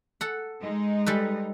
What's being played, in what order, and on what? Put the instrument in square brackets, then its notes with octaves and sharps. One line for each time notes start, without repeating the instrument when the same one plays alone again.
[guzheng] A4 F#5
[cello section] G#3 D#4
[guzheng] G3 A4 B4